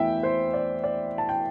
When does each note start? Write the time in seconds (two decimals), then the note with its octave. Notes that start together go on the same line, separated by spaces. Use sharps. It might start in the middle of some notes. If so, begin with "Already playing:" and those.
Already playing: E2 E3 A3 E4 E5 G5
0.23 C5
0.54 D5
0.84 D5
1.18 A5
1.29 G5